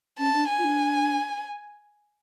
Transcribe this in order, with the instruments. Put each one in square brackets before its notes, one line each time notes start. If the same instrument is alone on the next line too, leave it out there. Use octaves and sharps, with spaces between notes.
[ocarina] C#4 [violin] A5
[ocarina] D4
[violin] G#5
[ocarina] F4
D4